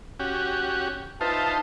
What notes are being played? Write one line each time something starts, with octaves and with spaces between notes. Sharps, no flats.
C#4 F#4 G4
D#4 F4 B4 C5 E5 A5